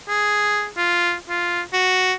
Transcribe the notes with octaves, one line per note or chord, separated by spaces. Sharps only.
G#4
F4
F4
F#4